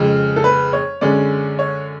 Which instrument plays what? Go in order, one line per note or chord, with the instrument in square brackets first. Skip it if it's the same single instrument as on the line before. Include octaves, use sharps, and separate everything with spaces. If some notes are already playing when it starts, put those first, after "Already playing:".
Already playing: [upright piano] F2 C#3 G#3
[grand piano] A4
B4
C#5
[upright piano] F#2 D3 G#3 C#4 [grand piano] D5
[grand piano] C#5